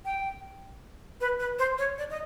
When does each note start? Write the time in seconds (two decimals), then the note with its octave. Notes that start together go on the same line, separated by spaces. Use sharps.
0.05 G5
1.21 B4
1.40 B4
1.59 C5
1.78 C#5
1.98 D5
2.10 D#5